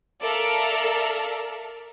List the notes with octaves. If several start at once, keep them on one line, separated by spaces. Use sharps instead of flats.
A4 A#4 D5 E5 F5 A#5